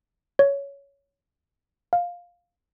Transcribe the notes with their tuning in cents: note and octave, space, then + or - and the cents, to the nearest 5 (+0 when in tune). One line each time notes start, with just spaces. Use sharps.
C#5 +10
F5 +10